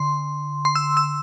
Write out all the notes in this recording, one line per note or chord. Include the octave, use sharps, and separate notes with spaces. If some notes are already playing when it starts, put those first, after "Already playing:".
Already playing: D3 C6
C6
E6
E6